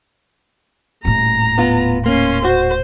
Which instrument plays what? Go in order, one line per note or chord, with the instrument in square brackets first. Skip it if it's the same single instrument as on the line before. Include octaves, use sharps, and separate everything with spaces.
[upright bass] D#1 A2 [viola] A#5
[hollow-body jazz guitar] B3 F4
[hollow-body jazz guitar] A#3 [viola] C#4 C6
[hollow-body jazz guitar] F#4 [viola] C5